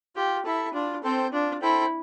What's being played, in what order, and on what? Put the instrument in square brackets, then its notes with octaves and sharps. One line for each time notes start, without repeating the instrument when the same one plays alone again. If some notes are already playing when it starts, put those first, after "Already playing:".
[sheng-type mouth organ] F4 [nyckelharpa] G4
[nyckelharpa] E4 [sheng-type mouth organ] A4 E5
[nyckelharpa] D4 [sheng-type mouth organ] F4
[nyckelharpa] C4 [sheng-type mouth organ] A4 C5 G5
[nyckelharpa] D4 [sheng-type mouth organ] F4
[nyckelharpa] E4 [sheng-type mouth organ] A4 C5 G5